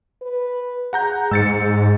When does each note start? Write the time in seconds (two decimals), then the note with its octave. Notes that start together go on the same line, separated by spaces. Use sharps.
0.22 B4
0.93 G#4 F#5 A#5 G6
1.31 G#2 E6 A6 C#7